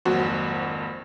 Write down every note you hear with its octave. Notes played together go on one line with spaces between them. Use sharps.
G#1 F2 F#3 A#3 F#4 C5